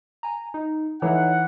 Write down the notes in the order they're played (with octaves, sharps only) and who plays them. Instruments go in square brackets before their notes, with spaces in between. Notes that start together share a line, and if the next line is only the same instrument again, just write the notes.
[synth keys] G#5 A#5
D#4
[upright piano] E3 [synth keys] D#4 A4 C#5 [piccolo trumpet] F#5